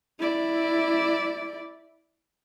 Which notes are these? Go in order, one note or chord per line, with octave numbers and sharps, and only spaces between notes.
E4 D5